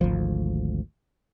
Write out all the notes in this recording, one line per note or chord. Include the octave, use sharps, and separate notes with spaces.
G#1 D2 F3